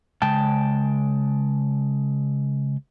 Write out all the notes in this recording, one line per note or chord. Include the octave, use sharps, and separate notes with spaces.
C#3 G#3 G5 A5